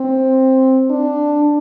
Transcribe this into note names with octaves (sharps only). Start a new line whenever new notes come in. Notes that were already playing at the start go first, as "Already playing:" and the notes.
Already playing: C4
D4